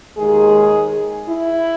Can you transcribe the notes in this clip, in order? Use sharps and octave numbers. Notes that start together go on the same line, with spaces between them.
D#2 D#3 G#3 G#4
E4